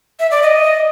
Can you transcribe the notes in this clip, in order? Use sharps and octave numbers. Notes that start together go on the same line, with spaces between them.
E5
D5
D#5